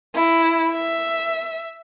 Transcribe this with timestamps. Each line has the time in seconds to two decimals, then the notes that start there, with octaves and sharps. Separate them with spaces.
0.16 E4
0.74 E5